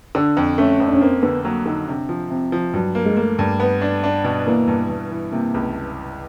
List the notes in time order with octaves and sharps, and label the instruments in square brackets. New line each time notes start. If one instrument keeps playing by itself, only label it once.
[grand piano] D3 [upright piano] D4
[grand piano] F2
[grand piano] A3 [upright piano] C#4
[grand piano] F2
[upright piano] D4
C#4
[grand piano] A#3 [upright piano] C4
[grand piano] D3 [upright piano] B3
[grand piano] F#3 [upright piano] A#3
[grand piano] D3 [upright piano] D#4
[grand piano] C3 [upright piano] D4
[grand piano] F3
[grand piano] C3 [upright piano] C4
[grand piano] F3
[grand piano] G2 [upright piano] F#3
[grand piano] A#3
[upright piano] G#3
[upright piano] A3 [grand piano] A#3
[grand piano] G2
B3
D4
D4
B2
[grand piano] E3 [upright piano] A#3
[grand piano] G2
G2
E3
[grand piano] C3 [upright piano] A#3
[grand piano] C#2